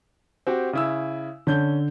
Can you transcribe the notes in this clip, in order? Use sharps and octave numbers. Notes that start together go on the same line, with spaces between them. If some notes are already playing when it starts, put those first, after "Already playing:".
C4 F#4 G4
C#3 E4 E6
D3 C#4 G6 G7